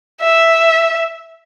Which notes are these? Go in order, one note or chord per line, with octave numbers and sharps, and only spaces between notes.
E5